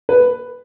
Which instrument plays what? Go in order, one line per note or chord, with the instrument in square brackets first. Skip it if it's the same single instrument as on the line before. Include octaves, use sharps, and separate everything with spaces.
[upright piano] B4